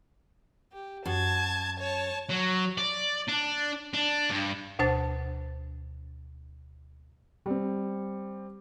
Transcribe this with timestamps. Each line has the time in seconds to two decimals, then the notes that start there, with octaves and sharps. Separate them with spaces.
0.72 G4
1.05 F#2 A5 G#6
1.80 C#5 A5
2.30 F#3
2.78 D5
3.29 D4
3.93 D4
4.30 G2
4.79 D2 B2 D4 C5 A5 A6
7.46 G3 C4